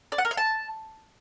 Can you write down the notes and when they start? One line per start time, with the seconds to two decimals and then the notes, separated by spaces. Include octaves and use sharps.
0.12 D5
0.18 F#5
0.25 A#4
0.31 F5
0.37 A5